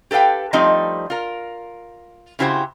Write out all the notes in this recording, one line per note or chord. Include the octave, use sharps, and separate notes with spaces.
G4 A4 B4 F5 G5
F3 G3 A3 C4 D#4 D#5
F4 A#4
C#3 C4 E4 F#4 G4 C5